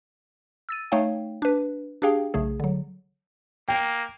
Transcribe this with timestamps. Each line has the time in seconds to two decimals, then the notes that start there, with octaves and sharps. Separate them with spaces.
0.69 E6 A6 D#7
0.92 A3 D#4 C#5 F5 G5
1.42 D4 B4
2.02 D4 G4 G#4 F5 G5
2.34 B1 C#3 A3 G#4
2.60 D3 F#3
3.68 A#3 G5